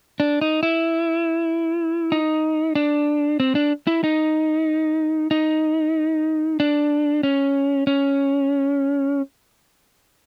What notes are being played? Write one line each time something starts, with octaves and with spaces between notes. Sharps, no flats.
D4
D#4
E4
D#4
D4
C4
D4
E4
D#4
D#4
D4
C#4
C#4